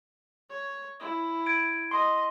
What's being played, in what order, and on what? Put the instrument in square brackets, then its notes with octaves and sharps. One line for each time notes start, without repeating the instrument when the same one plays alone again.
[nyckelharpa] C#5
E4
[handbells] G#6 D7
[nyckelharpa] D#5 [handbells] C6